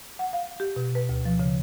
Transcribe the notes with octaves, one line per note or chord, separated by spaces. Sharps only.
F#5
F5
G4
B2
B4
D2
F3
C#3